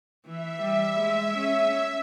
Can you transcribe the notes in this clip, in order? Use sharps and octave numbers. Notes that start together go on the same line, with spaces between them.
E3 E5
G3
G#3
C#4